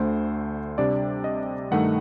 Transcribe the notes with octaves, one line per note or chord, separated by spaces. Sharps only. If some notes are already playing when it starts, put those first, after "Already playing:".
Already playing: D2 D3 A3 C5
C3 G3 D4 D5
D#5
G2 D#3 A3 D#4 F#5